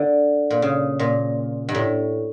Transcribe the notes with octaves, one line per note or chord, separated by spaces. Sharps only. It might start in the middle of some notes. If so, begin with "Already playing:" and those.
Already playing: D3
A#2
C#3
A#2
G2
A2